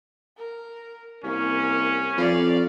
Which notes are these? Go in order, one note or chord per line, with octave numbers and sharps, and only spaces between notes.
A#4
C2 A#3 C#4
F2 D5 F5